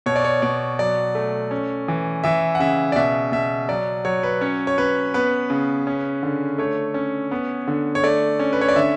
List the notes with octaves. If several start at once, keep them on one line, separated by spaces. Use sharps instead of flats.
B2 C#5
D5
C#5
B2 D5
F#3 D5
A3
C#4
E3
E3 E5
F#5
C#3 E5
D5
B2 E5
B2 E5
F#3 D5
F#3 C#5
B4
C#4 C#5
C#5
C#4 B4
B3 B4
C#3
C#4
D3
A3 C#5
C#4
B3
D3
C#5
A3 D5
C#4
B4
C#5
D5
D3 E5